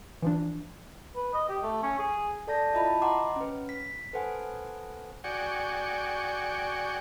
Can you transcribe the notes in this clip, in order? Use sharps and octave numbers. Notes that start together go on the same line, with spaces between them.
E3 F3 D4
B4
D#5
G4
A3
C#4
G#4
A4 D5 A5 G6 A#6
E4 F4 D#5 E5 A5 B5
D#5 F#5 A#5 C6 D6
C#4 B4
B6
A4 B4 C5 F#5 G#5
F#4 G#4 D5 G5 C#6